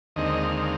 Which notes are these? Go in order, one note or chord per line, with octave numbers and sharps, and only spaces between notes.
D#2 D3 G#3 C4 D#4 D#5
F5